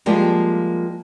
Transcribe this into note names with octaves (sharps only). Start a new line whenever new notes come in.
F3 G3 G#3 A#3 G4